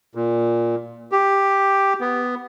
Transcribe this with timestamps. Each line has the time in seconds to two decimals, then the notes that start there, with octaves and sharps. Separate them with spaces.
0.15 A#2
1.12 G4
2.01 B3